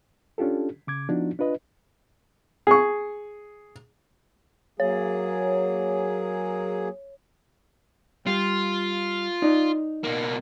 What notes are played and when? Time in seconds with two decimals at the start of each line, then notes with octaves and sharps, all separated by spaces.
0.38 C#4 D4 F4 G4 A4
0.87 C#3 D6 G#6
1.09 F3 B3 D4 D#4 F4 F#4
1.39 D4 F4 B4 D#5
2.67 G#4 C#6
4.80 F#3 A#3 G#4 C#5
8.26 G3 F4
9.42 D#4 D5
10.04 B2 A#3